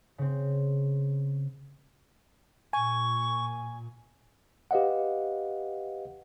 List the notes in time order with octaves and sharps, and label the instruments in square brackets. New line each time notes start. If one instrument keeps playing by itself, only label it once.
[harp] C#3 C4
[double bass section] A#2 [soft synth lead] G#5 [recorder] C#6
[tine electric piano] G4 B4 D#5 F5 F#5